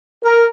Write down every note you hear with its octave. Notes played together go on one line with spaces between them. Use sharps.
A#4